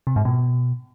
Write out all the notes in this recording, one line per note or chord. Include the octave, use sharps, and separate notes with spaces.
C3
G#2
B2